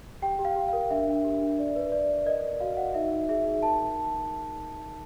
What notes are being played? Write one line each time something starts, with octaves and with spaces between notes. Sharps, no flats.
G4 G5
G4
F5
G4
A#4 F5
D4 E5
D4
G4
D4
D5
B4
D5
D5
A#4 D#5
D5
F#4 F5
F#4 F#5
D#4 E5
D#4
G#4 E5
D#4
A#4 A5